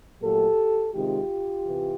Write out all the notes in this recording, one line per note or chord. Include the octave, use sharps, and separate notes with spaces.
A#2 F#3 A3 G4 A4
C3 D#3 G#3 F4 G4
C3 E3